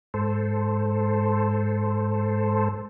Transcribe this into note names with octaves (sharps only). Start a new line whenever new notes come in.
G#2 A4 C5